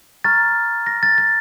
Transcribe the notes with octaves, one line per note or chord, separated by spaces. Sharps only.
A#5 C#6 F6 A6
A#6
A6
A6